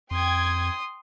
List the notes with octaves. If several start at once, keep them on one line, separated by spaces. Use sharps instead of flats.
F2 G5 C6 D#6 G#6